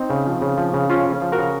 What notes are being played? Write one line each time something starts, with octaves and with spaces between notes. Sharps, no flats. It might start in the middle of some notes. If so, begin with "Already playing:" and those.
Already playing: C4 D#4
C#3
F3
C#3
F3
C#3
F3 C#4 F4
C#3
F3
F#4 A#4
C#3